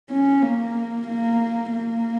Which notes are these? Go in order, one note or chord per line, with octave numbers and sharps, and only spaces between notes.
C#4
A#3
A#3
A#3